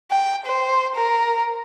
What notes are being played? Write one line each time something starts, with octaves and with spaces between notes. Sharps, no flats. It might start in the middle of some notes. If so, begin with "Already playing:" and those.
G5
C5
A#4